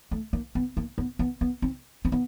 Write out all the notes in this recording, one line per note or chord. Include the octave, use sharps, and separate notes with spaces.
A3
A#3
B3
A#3
B3
B3
B3
C4
C4
B3